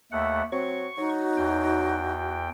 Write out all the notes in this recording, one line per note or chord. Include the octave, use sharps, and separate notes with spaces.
D#2 A3 E5 F#5
F#3 C4 C#6
F#3 D#4 F#4
E2 G5